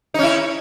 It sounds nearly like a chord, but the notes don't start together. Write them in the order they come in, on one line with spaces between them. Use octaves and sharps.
D#4 C#4 E4